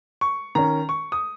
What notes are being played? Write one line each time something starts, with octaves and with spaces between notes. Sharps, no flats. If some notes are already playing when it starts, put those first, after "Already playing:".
C#6
D#3 C#4 A#5
C#6
D#6